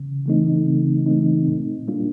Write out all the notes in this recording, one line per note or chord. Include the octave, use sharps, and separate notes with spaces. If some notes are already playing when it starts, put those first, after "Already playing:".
Already playing: C#3
E3 A3 C4 D#4
C#3
E3 A3 C4 D#4
A#2
G3 A#3 D4 F4